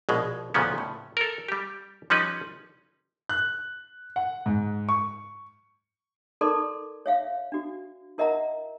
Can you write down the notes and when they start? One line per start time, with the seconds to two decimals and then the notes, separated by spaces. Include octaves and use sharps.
0.09 A#1 B2 G#3
0.54 D2 A#2 C#3 F3 B3 C#4
0.78 A2
1.17 A4 A#4
1.48 G3 G4
2.10 F3 G3 C#4 D#4 B4
3.29 F#6
4.16 F#5
4.46 G#2
4.89 C#6
6.41 D#4 A4 A#4 D5 C6 D6
7.06 C#5 E5 F5
7.52 D4 F#4
8.18 E4 A#4 D#5 E5 F#5 A#5